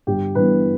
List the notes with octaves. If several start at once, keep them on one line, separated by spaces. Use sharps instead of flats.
G1 G4
G2 E3 B3 B4